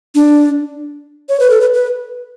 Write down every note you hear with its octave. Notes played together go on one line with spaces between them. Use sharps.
D4
C#5
B4
A4
B4
B4